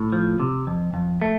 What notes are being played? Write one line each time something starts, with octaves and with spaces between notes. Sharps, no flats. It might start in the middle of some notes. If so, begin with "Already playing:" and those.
Already playing: A2
F3
C3
F2
F2
A3